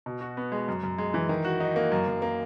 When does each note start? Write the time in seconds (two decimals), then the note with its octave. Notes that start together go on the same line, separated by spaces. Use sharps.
0.06 B2
0.21 F#4
0.37 B3
0.52 G#3
0.68 F#2
0.83 F#2
0.98 G#3
1.14 E3
1.29 D#3
1.44 F#4
1.60 D#4
1.76 A#3
1.92 F#2
2.07 F#2
2.22 A#3